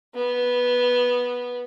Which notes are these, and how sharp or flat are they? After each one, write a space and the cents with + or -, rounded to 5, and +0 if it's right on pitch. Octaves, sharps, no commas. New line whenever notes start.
B3 -10